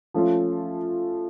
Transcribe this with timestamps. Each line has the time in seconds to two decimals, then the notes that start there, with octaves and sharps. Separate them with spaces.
0.14 F3 A3 C#4 F4